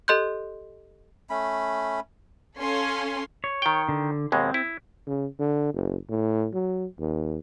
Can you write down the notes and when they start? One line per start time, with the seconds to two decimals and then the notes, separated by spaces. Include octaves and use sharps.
0.08 G4 A4 D#5 C6 F#6 G6
1.30 A3 C#4 B5
2.58 C#4 A4 C#5 F5 G#5 C6
3.44 C#5
3.62 D#3 G5
3.89 D3
4.32 D#2 B2 G#3 C4
4.54 E4
5.07 C#3
5.39 D3
5.74 F#1
6.09 A2
6.54 F#3
7.00 D#2